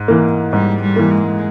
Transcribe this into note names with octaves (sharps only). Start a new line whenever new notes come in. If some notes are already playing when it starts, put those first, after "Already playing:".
Already playing: G#2
E3 A#3
G#2 G3
G3
E3 A#3
G#3